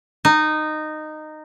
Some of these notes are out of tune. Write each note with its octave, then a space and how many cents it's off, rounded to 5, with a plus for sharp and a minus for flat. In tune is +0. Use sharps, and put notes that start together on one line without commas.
D#4 -15